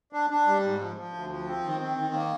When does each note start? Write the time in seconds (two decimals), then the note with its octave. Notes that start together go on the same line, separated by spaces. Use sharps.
0.13 D4
0.30 D4
0.47 G3
0.63 G#2
0.80 F3
0.96 F3
1.14 D2
1.30 F3
1.47 C4
1.64 D#3
1.80 C4
1.97 D#3
2.14 A#3